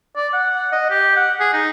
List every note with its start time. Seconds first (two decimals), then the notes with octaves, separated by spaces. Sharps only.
0.16 D5
0.33 F#5
0.73 D#5
0.90 G4
1.17 F#5
1.40 G#4
1.53 D#4